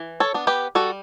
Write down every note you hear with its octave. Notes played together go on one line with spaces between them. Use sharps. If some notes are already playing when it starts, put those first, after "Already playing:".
Already playing: E3
A4 C#5
B3 D4
G4 B4
G3 F#4 A4